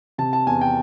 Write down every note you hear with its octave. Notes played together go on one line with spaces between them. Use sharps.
C3 A5
A5
E2 G#5
G5